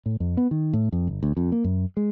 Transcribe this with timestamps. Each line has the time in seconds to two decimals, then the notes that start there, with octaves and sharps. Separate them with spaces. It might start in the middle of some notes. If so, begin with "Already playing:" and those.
0.06 A2
0.20 F2
0.37 B3
0.51 D#3
0.73 A2
0.92 F2
1.07 G1
1.23 D2
1.37 F2
1.52 A#3
1.64 F#2
1.97 G#3